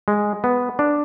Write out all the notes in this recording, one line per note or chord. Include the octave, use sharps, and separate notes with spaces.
G#3
B3
D4